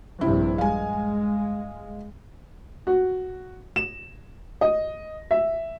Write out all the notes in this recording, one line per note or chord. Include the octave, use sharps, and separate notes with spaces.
A#1 G2 C3 E4
G#3 F5 G#5
F#4
E7
D#5
E5